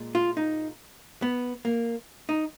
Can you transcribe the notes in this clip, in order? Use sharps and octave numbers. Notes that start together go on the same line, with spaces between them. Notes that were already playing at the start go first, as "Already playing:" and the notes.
Already playing: A#2 G#3
F4
D#4
B3
A#3
D#4